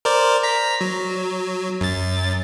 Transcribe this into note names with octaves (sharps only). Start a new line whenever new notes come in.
A#4 C5 D5
A#5 B6
F#3
F#2 A6